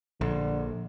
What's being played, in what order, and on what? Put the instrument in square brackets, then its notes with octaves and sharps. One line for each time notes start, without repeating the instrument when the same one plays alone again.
[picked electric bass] A#1 [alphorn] D3